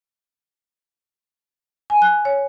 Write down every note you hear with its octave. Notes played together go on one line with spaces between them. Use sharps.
G#5
F#6
C#5